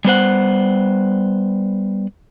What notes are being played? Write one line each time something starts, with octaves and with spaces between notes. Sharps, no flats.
G3 B3 C5 F#5